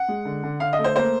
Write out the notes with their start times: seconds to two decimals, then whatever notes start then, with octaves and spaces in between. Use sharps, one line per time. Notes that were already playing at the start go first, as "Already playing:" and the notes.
Already playing: F#5
0.08 G#3
0.25 D3
0.43 D3
0.60 D3 F5
0.73 D#5
0.79 A3
0.84 C5
0.96 A#3 C5